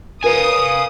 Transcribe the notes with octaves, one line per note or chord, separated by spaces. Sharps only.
A#4 B4 F5 G#5 D#6